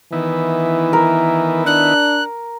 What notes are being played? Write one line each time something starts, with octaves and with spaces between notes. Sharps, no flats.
D#3 E3 B3 E4
A#4
D4 F#6